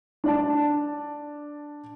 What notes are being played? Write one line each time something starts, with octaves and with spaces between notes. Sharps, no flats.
D4 D5 A5